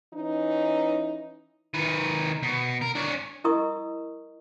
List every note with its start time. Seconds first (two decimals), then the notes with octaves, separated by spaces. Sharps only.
0.14 E3 C#4 D#4
1.74 D#3 B4
2.43 B2
2.81 A#4
2.95 D4 C#5
3.44 E4 A#4 D#5 C#6 D#6